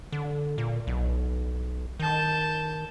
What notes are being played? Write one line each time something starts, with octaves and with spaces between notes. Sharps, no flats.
D3
A#2
B1
D#3 A5 G6